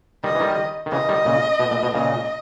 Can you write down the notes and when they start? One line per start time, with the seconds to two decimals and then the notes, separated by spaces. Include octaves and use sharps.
0.24 D#3 G3 D#5
0.35 E3
0.40 D#3 G3
0.86 D#3
0.92 C#3 E3 D#5
1.09 D#3 G3
1.25 A#2 C#3
1.60 B2
1.71 A#2
1.83 B2
1.94 A#2 C#3 D#5